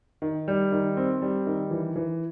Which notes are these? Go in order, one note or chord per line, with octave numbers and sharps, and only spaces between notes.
D#3
G3
D#3
C4
G3
D#3
E3
E3